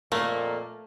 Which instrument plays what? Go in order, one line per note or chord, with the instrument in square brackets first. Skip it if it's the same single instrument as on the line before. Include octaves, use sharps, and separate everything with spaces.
[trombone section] F2 A#2 [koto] A3 [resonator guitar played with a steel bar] A#3